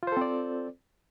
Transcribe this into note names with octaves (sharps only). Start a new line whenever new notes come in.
C4 F4 A4 C5 D5